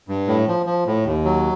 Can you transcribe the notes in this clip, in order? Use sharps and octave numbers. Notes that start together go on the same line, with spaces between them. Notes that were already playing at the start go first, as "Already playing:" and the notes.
G2
A2
F3
F3
A2
D#2
F#3